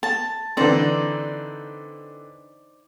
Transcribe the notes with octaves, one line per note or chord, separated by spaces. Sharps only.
A5
D3 E3 C4 D#4 C5 D5